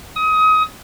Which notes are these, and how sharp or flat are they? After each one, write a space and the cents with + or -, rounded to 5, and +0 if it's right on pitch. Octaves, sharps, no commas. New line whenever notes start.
D#6 +25